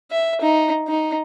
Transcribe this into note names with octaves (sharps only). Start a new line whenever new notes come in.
E5
D#4
D#4